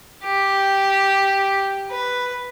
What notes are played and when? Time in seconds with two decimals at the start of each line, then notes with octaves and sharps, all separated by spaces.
0.24 G4
1.91 B4